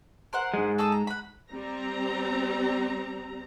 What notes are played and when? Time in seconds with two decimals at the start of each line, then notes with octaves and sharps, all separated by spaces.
0.33 A#4 C5 F#5
0.54 G#2 G#3
0.78 A4 D#5 E6
0.92 A#5
1.07 F#5 B5
1.51 G3 C4 A#5